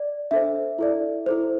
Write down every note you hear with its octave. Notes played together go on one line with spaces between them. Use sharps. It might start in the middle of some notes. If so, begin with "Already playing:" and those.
Already playing: D5
D4 A4 C5 E5
E4 A4 D5
E4 A4 C5